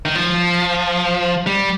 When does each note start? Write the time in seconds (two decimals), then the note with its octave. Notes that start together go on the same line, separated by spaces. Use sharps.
0.05 D#3
0.15 F3
1.47 G3